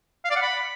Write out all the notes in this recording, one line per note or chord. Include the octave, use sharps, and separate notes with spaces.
F5
D5
F#5
B5